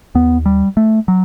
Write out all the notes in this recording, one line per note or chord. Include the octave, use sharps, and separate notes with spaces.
D#2 B3
G3
A3
F#3